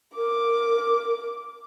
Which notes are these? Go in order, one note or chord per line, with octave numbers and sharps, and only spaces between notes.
A#4 D6